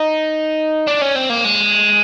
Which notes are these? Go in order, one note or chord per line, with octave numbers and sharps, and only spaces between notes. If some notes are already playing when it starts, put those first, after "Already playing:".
Already playing: D#4
D4
C#4
C4
A#3
G#3